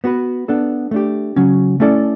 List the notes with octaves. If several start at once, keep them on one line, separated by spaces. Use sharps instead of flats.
B3 F#4 B4
B3 D4 A4
A3 D4 G4
C#3 F#3 C#4
A3 C#4 E4 A4 D5